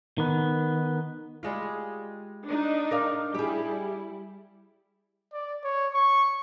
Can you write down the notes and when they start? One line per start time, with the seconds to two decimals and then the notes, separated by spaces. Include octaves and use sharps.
0.18 D#3 B3
1.43 G3 G#3 F4
2.46 D4 D#4
2.91 A#4 D5 F5
3.34 G3 E4 G4 G#4
5.33 D5
5.64 C#5
5.94 C#6